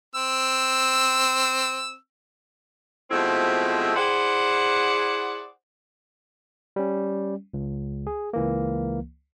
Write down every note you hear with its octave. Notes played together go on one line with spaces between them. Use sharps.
C4 E6
B2 F3 G#3 A3 C4 E4
E4 G#4 C5 D5 F#5
G3 C#4
C#2
G#4
C#2 E3 A#3